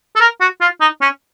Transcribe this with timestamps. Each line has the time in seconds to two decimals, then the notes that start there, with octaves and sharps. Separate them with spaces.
0.16 A4
0.21 A#4
0.41 F#4
0.61 F4
0.81 D#4
1.02 C#4